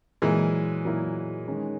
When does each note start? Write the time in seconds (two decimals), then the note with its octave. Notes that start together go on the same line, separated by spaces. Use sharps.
0.22 A#2 E3 F#3 G#3 A#3 E4 A#4
0.85 A#2 F#3 A#3 E4 A#4
1.47 D#3 G#3 C#4